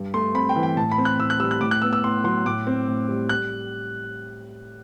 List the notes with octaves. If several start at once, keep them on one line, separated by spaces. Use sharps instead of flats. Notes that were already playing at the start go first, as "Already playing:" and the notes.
Already playing: G2
A3 C6
C4 B5
G5
E3
G5
A2 A5
B5
C4
F#6
A2 E6
F#6
G3 E6
F#6
A2 D6
F#6
B3 E6
E6
A2 C6
F#3 C6
A2 D6
C4
A2
G3
F#6